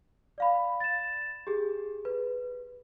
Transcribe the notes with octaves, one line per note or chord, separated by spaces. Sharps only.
D5 F5 B5
A6 E7
G4 G#4
B4